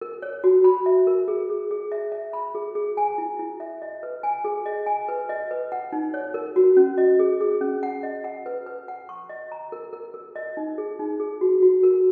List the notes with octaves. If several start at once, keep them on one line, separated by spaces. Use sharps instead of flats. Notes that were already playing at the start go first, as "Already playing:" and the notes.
A#4
C#5
F#4
B5
E5
A#4
G#4
G#4
G#4
E5
E5
B5
G#4
G#4
G#5
E4
E4
E5
D#5
B4
G#5
G#4
D#5
G#5
B4
D#5
B4
F#5
D#4
C#5
A#4
F#4
C#4
D#5
G#4
G#4
C#4
F#5
D#5
F#5
B4
B4
F#5
C#6
D#5
A#5
A#4
A#4
A#4
D#5
D#4
G#4
D#4
G#4
F#4
F#4
A#4